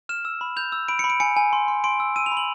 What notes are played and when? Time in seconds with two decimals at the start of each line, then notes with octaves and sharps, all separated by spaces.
0.09 F6 E7
0.25 E6 E7
0.41 B5
0.56 G6 F7
0.72 E6
0.88 B5 D7
0.99 B5 C#7
1.10 D7
1.20 G#5 C#7
1.36 G#5
1.53 C6
1.68 C6
1.84 C6 D7
2.00 E6
2.16 E6 D#7
2.26 F7
2.32 B5
2.37 F#7